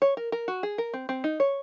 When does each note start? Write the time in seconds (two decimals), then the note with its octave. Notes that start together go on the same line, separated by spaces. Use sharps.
0.02 C#5
0.17 A#4
0.32 A#4
0.48 F#4
0.63 G#4
0.78 A#4
0.94 C4
1.09 C4
1.24 D#4
1.40 C#5